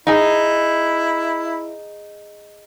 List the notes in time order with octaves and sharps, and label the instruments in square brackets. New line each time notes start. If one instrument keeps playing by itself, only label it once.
[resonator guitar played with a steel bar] D#4 G#4 [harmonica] E4